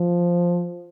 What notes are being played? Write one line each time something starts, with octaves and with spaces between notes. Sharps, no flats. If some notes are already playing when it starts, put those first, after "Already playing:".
Already playing: F3